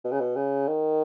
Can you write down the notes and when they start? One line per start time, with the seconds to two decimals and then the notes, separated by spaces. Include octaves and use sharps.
0.04 B2
0.12 C#3
0.20 B2
0.36 C#3
0.68 D#3